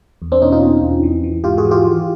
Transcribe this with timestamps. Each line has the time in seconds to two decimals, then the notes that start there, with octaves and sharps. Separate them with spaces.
0.22 E2
0.32 C4 D4
0.42 B2 C#4 D#4
0.52 D#4 F4
0.63 B2
0.83 E2
1.03 E3
1.24 E3
1.44 G#2 F4 G4
1.58 F#4 G#4
1.65 E3
1.71 F4 G4
1.85 E3